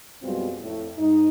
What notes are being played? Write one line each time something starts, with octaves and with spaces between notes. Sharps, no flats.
F#2 B2 G3 G#3 C4 F4
F2 A2
G#2 D#4